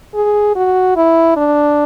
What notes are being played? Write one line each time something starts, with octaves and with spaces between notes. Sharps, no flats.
G#4
F#4
E4
D4